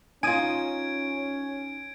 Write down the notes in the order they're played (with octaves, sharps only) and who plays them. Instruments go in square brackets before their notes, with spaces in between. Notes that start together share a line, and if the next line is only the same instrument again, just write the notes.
[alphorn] C#4 [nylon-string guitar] D#4 F4 [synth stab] G#5 D#6 [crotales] G#6 D7